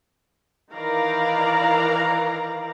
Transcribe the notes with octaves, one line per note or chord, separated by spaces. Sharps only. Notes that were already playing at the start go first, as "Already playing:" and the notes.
D#3 E3 A#4 D5 F5 A#5